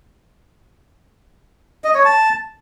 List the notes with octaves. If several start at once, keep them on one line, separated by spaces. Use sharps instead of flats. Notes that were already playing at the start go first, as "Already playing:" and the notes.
D#5
C#5
A5